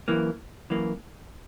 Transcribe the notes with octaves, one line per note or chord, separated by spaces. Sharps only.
F#2 E3 A#3
F#2 E3 A#3